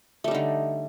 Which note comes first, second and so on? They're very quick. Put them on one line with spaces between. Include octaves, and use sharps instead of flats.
A3 G3 D#4 D3